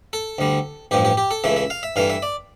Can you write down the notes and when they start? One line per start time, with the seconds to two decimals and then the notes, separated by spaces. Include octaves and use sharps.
0.13 A4
0.39 D2 D3 G3
0.91 A1 G2 F3 G4
1.05 G4
1.17 G4
1.31 A4
1.44 C#2 C#3 E3 A3 E5
1.56 E5
1.70 F5
1.83 E5
1.96 G2 E3 A3 F5
2.10 E5
2.23 D5